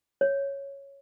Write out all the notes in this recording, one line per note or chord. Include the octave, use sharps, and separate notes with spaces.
C#5